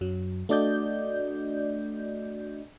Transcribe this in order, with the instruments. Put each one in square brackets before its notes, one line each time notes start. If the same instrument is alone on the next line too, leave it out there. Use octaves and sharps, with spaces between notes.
[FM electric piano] F#2 F#3
A3 D4 F#4 D5 D#5 G6